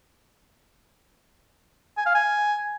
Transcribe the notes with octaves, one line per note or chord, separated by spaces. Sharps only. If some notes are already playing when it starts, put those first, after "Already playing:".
G#5
F5
G#5